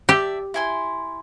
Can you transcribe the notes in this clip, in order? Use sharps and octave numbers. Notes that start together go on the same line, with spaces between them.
G4 D5 E5 A5
E4 G#5 C6